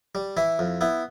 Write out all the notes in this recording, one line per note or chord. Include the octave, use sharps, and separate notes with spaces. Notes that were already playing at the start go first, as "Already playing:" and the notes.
G3
E3 E4
F2
B3 E4